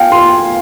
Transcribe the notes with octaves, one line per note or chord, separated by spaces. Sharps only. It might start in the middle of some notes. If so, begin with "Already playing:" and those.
Already playing: F5 G5 G#5
C6